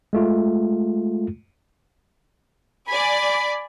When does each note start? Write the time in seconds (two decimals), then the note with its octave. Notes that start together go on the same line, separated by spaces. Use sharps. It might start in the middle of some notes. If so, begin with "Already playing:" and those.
0.13 G#3 A3 F4
2.88 D5 G#5 B5